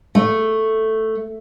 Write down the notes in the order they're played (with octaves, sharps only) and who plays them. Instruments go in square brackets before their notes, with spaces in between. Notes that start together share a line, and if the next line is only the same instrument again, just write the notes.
[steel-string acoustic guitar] A3